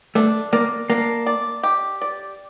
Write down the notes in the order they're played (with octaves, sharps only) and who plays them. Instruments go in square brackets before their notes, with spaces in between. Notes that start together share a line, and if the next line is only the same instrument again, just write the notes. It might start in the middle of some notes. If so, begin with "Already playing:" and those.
[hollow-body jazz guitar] A3 [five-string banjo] D4
[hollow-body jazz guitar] A#3 [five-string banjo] D5
[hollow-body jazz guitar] A#3 [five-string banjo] D4
[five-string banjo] D5
G4
D5